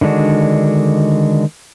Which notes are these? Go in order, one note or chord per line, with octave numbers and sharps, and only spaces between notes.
D3 D#3 G#3 D4 F#4